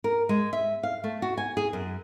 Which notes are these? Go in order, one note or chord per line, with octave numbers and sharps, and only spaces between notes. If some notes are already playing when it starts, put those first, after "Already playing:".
A#4
G#3
E5
F5
A3
F#4
G#5
G#4
F#2